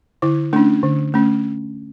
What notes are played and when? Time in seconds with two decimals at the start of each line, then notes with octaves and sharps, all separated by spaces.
0.22 D3 E4
0.53 A3 C#4 D4
0.83 D3
1.14 A3 C#4